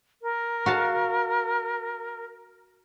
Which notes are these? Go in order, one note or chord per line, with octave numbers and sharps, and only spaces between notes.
A#4
F#4 F5 A5